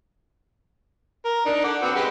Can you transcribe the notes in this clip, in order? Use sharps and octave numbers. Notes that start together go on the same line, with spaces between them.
A#4
D4 D#4
F#5 D6
B3 C4 F#4
G#3 G4 B4